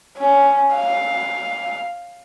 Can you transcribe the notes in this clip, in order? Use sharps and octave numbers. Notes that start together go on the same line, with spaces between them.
C#4
F5